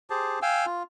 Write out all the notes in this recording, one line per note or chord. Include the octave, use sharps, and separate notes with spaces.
G4 G#4 C5 A5
F5 G5 G#5 E6
F4